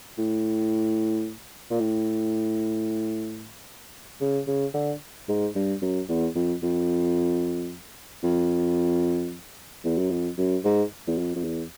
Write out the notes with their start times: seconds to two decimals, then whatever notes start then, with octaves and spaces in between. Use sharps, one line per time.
0.18 A2
1.70 A#2
1.79 A2
4.21 C#3
4.47 C#3
4.74 D3
5.28 G#2
5.55 G2
5.82 F#2
6.09 E2
6.35 F2
6.63 F2
8.23 F2
9.84 E2
9.98 F#2
10.10 F2
10.38 F#2
10.64 G#2
11.07 E2
11.18 F2
11.35 F2
11.44 E2